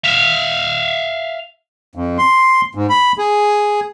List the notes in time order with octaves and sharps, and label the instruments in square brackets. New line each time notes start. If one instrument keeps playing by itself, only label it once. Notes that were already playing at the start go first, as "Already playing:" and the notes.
[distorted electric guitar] E5 F5
[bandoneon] F2
C6
G#2
B5
G#4